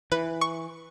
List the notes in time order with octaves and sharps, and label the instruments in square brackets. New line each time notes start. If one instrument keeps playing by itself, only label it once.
[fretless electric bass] E3 [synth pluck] B4
[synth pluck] C#6